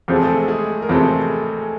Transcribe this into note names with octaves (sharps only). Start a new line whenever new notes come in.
E2 C3 F3 G#3 C4 A4
G#4
A3 A4
G#3 G#4
A#4
E2 C3 F3 G#3 A3 C4 A4